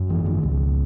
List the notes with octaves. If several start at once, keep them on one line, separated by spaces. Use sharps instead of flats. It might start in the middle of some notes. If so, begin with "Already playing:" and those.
Already playing: F#2
G#1 E3
D#3
C#2